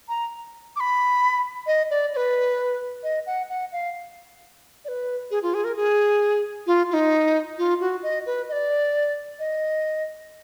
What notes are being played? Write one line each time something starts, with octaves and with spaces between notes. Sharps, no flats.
A#5
D6
B5
D#5
D5
D5
B4
D#5
F#5
F#5
F5
D5
B4
G#4
F4
G#4
A#4
G#4
F4
F4
D#4
F4
F#4
D#5
B4
D#5
D5
D#5